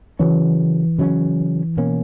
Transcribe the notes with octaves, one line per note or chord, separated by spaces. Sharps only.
C#3 E3 F#3 C#4
C#3 F#3 C#4
B2 A#3 C#4